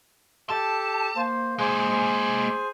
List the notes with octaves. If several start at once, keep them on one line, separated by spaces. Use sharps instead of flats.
G4 A4 A5
A#3 C5
G#3 A#3 G#4 C5 G#5